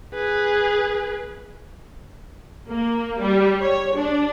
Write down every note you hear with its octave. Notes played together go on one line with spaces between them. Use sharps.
G#4 B4
A#3
G3
C#5
D4